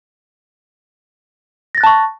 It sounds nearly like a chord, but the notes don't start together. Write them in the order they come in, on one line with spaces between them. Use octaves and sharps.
A#6 A6 F#6 A5 C#6